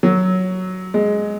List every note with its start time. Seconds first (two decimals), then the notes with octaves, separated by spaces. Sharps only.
0.03 F#3
0.94 G#3